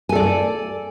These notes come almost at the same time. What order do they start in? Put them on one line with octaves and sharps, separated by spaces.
G#5 A4 D5